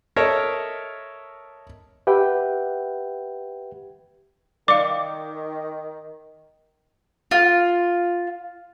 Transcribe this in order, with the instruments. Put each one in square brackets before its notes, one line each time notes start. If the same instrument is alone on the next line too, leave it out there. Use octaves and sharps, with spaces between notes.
[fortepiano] A4 A#4 C#5 D#5 E5
[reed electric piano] G4 B4 E5 F#5 G5
[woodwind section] D#3 [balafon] D5 F5 [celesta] D6
[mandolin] F4